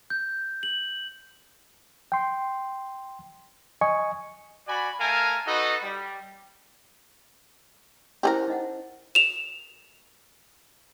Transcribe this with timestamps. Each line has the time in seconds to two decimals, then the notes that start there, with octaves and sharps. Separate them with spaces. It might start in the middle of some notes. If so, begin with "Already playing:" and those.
0.10 G6
0.63 F#7
2.12 G5 C6
3.81 D#5 G#5 C#6
4.68 F#4 D5 G#5 B5
5.00 A3 A#4 F5 G#5 A5
5.47 D#4 F#4 A4 B4 D#5
5.82 G3
8.23 C#4 E4 G4 G#4 A#4 C5
8.48 D#4 D#5 F#5
9.15 E7 F7